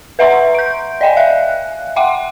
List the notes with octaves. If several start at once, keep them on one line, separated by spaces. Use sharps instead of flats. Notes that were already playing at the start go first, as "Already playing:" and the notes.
B4 E5 F#5 A#5 C6 C#6
G6 D7
D5 D#5 G5 G#5
E5 F5 F#6
E5 F#5 G5 C6 D6